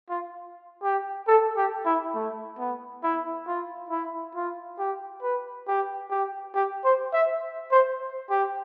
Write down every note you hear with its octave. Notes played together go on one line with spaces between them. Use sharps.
F4
G4
A4
G4
E4
A3
B3
E4
F4
E4
F4
G4
B4
G4
G4
G4
C5
E5
C5
G4